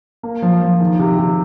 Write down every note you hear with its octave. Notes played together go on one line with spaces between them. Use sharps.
A#3
F3
F3
D#3
C3
C3